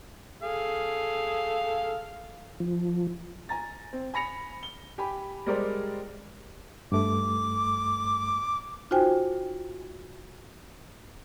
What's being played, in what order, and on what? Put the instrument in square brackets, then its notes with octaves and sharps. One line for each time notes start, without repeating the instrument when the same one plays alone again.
[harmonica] G#4 A4 F5
[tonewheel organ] F3
[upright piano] G#5 A#5 A6
C4
G#5 B5 A#6 C#7 F7
G7
G4 G#5 B5
G3 G#3 G4 A#4 C5 D5
[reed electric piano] G2 A3 [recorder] D6
[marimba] D#4 F4 F#4 C5 G5 G#5